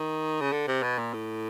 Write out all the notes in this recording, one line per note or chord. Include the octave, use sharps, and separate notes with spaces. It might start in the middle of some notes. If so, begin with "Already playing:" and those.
Already playing: D#3
C#3
D3
C3
B2
A#2
A2